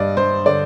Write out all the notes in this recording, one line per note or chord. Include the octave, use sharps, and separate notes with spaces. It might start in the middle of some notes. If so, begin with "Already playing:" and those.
Already playing: G2 G3 D5 D#5
G2 C5
D3 D5